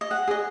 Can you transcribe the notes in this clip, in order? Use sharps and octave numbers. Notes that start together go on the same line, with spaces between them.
D#5
G#4 F#5
G#4 D#5